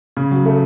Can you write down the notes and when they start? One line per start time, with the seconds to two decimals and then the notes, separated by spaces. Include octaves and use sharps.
0.17 C#3
0.31 F#3
0.46 A3